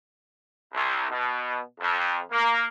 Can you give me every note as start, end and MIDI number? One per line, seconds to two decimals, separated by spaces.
0.73 1.06 36
1.10 1.58 47
1.79 2.19 41
2.31 2.66 58